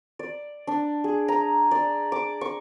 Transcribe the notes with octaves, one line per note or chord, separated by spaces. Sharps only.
D5
D4
G#4
A#5
D5
D6
C#6